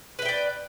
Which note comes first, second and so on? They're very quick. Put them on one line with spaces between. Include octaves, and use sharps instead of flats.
B4 E5 G5 D5